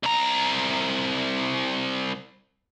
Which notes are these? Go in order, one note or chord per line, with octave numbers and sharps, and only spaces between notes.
C2 A#5